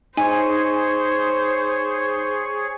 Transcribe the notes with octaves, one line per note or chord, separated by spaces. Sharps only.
D#4 G#4 C5 C#5 G#5